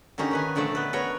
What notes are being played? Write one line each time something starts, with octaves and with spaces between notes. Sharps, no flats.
D3 A#3 C#4 D#4 G4
D#3 B4 G#5
A#2 D3 F3 A3 D5
B3 B4
B3 A#4 C#5